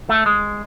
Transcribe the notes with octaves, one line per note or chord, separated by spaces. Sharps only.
A3
G#3